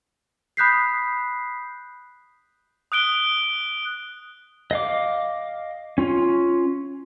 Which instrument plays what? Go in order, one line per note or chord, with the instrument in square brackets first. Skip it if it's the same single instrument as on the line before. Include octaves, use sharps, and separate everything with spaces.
[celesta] B5 D#6 F#6 G6 B6 C7
[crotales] D#6 F#6 D7 G7
[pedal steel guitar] D#5 F5 D6
C#4 F4